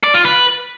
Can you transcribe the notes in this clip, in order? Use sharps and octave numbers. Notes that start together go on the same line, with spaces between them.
D5
F4
B4